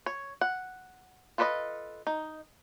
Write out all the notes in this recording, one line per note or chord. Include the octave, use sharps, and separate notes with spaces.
C#5
F#5
F4 A4 B4 D5 D#5
D#4